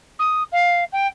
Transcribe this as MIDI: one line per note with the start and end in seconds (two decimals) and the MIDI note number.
0.19 0.43 87
0.52 0.84 77
0.92 1.07 79